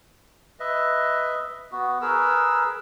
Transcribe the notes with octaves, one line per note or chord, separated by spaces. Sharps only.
B4 D#5 E5
B3 F#4
G#4 A#4 B4 E6